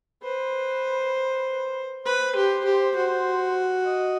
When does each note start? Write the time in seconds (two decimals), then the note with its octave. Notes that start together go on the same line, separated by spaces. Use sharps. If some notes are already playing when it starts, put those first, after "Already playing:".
0.23 B4 C5
2.05 B4 C5
2.36 G4
2.65 G4
2.96 F#4
3.86 D#5